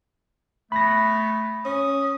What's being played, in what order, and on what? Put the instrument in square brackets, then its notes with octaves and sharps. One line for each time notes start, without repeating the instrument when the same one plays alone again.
[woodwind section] A3 B3 [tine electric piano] B5 A#6
[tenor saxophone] C#4 [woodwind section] D#6